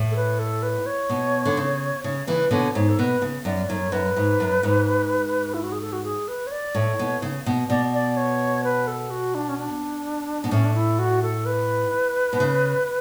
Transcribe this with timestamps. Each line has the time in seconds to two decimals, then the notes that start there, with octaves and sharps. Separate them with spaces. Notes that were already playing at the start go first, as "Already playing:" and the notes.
Already playing: A2
0.11 A4
0.16 B4
0.39 A4
0.63 B4
0.86 C#5
1.09 B2
1.45 D3
1.57 C#3
2.04 C#3 C#5
2.27 C#3 E3 B4
2.51 B2 D3 C#5
2.75 G#2 C#5
2.89 A4
2.99 B2 B4
3.22 C#3
3.45 F#2 D5
3.69 F#2 C#5
3.92 F#2 B4
4.17 G#2
4.40 F#2
4.63 G#2
5.54 E4
5.63 F#4
5.72 G#4
5.81 A4
5.93 F#4
6.04 G#4
6.28 B4
6.47 C#5
6.52 D5
6.75 A2 C#5
6.99 B2
7.22 C#3
7.46 B2
7.70 B2 D5
7.94 D5
8.17 C#5
8.64 B4
8.87 A4
9.10 F#4
9.35 D4
9.49 C#4
9.58 D4
10.44 B2
10.51 A2 C#4
10.65 D4
10.75 E4
10.99 F#4
11.22 A4
11.46 B4
12.33 B2
12.40 C#3